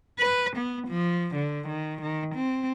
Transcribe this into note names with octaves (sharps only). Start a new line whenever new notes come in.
B4
B3
F3
D3
D#3
D#3
C4